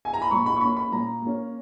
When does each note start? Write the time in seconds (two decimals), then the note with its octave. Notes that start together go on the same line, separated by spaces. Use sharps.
0.05 G#5
0.14 A#5
0.22 B5
0.31 A#2 C#6
0.46 B5
0.56 C#6
0.61 A#3 C#4 B5
0.77 B5
0.92 A#2 A#5
1.22 A#3 C#4